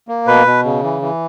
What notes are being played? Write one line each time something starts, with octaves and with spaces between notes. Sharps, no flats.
A#3
B2 B4
B2
C#3
E3
E3